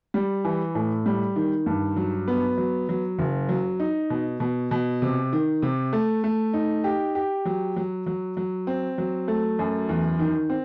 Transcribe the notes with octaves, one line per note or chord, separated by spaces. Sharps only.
G3
E3
A2
G3
D#3
G2
F#3
B3
F#3
F#3
F#1
F#3
D#4
B2
B2
B2
C3
D#3
C3
A3
A3
D#4
G4
G4
F#3
F#3
F#3
F#3
C4
F#3
A3
F#2
E2
D#3
C4